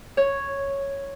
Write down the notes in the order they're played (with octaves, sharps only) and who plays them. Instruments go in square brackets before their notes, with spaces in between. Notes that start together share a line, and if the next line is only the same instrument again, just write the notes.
[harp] C#5